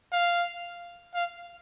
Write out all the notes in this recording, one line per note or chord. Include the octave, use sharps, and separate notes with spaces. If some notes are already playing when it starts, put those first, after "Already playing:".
F5
F5